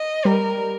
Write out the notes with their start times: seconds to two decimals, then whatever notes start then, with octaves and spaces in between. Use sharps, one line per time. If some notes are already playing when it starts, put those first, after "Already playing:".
Already playing: D#5
0.25 G3 A#4